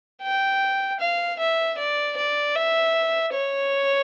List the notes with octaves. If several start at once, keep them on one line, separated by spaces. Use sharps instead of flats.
G5
F5
E5
D5
D5
E5
C#5